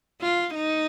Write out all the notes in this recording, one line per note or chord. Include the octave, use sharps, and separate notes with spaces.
F4
D#4